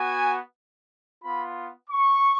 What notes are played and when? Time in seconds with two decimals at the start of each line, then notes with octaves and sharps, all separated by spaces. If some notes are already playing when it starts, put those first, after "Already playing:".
Already playing: B3 F#4 G#5
1.23 B3 F4 B5
1.90 C#6